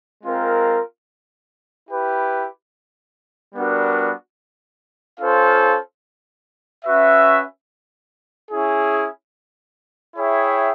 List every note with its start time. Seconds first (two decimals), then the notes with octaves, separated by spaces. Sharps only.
0.24 G#3 C4 F4 A#4
1.90 E4 G4 B4
3.55 G3 B3 D4 F#4 A#4
5.20 C#4 F4 A4 C5 F5
6.85 C#4 F#4 B4 E5
8.51 C#4 E4 G#4
10.16 E4 G#4 C#5 E5 G5